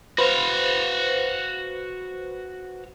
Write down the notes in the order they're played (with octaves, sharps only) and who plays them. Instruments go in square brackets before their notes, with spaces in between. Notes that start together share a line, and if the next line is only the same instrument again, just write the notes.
[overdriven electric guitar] F#4 F5 [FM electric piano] B4 C5